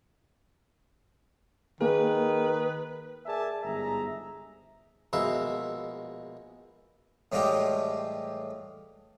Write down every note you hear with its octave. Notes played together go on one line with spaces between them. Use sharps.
D#3 A#3 G#4 B4
G#4 A#4 D5 E5 G#5 A5
G1 G#2 G#4 E5 A#5
A#1 B2 G#3 B4 E5 F5
A2 E3 G3 G#3 F4 G4